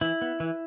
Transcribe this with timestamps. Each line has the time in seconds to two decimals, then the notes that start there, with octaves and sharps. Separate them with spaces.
0.01 E3 E4
0.22 B3
0.40 E3